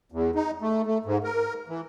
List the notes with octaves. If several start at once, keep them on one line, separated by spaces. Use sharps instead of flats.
E2
D#4
A3
A3
G#2
A#4
E3